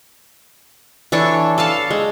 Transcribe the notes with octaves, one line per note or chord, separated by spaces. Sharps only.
E3 D4 A4 C#5
A4 F5 A5
G#3